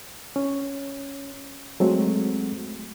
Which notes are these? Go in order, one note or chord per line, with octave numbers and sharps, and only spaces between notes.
C#4
F#3 G#3 A3 C4 F#4